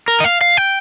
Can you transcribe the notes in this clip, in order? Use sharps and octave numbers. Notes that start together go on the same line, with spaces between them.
A#4
D#5
F5
F5
G5